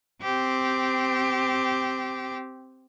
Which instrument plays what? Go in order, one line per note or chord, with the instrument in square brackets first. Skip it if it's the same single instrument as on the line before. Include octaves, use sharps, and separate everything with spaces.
[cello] C4 G4